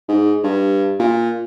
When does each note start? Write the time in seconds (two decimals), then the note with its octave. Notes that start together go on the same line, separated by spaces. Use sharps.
0.08 G#2
0.44 G2
0.99 A#2